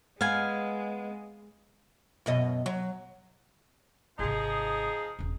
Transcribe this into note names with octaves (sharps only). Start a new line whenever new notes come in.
G#3 B3 F5 G#5
F#2 B2 D#5
F#3
G#1 C3 F3 D#4 G#4
E1 C#4